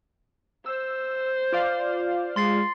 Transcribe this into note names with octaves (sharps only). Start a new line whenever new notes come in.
C5 E6
F4 D5 F5
G#3 C6 A6 C7